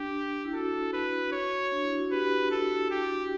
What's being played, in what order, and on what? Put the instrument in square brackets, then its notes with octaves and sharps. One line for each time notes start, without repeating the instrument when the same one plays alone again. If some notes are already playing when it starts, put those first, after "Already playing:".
Already playing: [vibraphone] D4 [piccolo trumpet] G4
[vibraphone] D4
E4
[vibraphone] F#4 [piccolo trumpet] A4
[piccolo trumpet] B4
C#5
[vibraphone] D4
E4
F#4
[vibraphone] G4 [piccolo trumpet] B4
[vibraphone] F#4 [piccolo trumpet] A4
[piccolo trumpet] G4